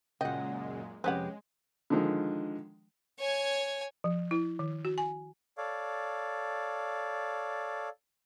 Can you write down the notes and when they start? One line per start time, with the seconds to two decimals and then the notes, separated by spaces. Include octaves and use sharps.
0.21 F#2 A#2 C#3 G#3 D#5 F#5 G5
1.04 F2 C3 G#3 C4 C#4 G4 B4 F#5
1.90 D3 D#3 F3 G#3
3.19 C#5 G#5
4.04 F3
4.31 E4
4.59 D#3
4.85 F#4
4.98 G#5
5.58 A4 C#5 D5 F5